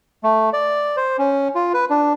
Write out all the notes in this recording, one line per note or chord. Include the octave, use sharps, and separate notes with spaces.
A3
D5
C5
C#4
F4
B4
D4